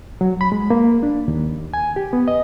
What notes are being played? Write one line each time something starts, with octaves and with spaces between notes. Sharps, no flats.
F#3
B5
G#3
A#3
D4
D#2
G#5
G4
B3
D#5